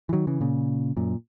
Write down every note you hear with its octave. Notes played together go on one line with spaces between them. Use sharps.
E3
D#3 F#3
C#3 E3
A#2 C#3
F#2 A#2